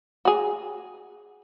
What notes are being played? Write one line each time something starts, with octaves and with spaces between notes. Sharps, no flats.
F#4 G#4